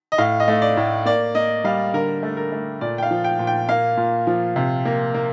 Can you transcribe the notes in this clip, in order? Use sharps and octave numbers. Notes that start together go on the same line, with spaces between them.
D#5
A2 F5
D#5
A3
D5
A2
A#3 D5
A#3 D#5
G3 F5
D3 A#4
A3
A#4
A3
A#2 D5
G5
F5
F3
G5
A#2
G5
A#3 F5
A#2
F3
C3
A#3
A#3